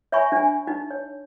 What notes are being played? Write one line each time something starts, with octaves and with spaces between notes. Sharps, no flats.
C#5 E5 G#5 B5 C#6
D4 G#5
D#4
C#5